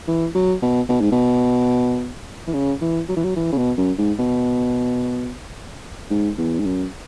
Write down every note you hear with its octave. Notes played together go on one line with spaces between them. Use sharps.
E3
F#3
B2
B2
G#2
B2
E3
C#3
E3
F#3
E3
F#3
E3
C#3
B2
F#2
G#2
B2
G#2
E2
G#2
F#2